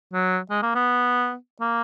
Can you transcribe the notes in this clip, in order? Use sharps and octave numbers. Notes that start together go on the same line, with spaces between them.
F#3
G#3
A#3
B3
A#3